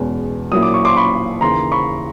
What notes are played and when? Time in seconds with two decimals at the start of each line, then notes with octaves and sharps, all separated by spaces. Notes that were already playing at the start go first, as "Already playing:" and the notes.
Already playing: E2 B2 G#3 C#4
0.51 A#2 F#3 A#3 C#4 E4 D#6
0.62 D6
0.74 C#6
0.85 C6 D6
0.97 B5 C#6
1.41 D#2 C#3 E3 A#5 C6
1.72 B5 C#6